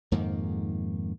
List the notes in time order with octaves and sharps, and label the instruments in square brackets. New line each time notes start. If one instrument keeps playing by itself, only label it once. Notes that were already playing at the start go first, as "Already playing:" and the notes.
[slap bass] F2 G#2 D#3 A#3